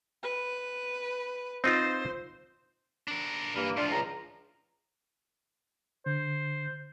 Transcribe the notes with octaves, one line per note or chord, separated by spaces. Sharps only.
B4
C4 D#4 F4 C5
D4 A#4
G2 E3 A#3
A2 F3 D4 F4
C#2 A#5
D3 C5